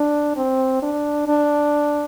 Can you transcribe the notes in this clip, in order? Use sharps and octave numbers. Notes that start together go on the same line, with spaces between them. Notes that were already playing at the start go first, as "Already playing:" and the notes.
Already playing: D4
C4
D4
D4